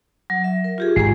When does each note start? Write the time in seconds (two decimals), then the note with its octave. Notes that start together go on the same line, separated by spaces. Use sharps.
0.30 F#3
0.44 E5
0.64 A#4
0.78 F4 G4 G#4
0.96 G#1 D#3 G#3 G#4